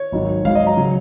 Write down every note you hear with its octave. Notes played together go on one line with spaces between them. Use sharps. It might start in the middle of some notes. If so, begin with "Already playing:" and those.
Already playing: C#5
G#1 G#2 D#3 F#3
G#1 G#2 D#3 F#3 F5
D#5
A#5
C#3 F#3